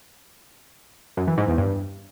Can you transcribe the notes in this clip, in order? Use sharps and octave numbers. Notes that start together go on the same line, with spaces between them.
F#2
E3
G#2
E2
G2